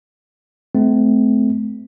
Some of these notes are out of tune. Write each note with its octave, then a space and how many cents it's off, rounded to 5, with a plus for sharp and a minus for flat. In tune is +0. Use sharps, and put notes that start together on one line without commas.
A3 -35 C4 -35